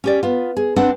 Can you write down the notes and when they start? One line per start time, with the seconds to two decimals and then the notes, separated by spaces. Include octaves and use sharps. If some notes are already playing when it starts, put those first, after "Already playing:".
0.04 C#4 G4 D5
0.23 B3 F4
0.57 G#4
0.76 C4 D4 B4 F#5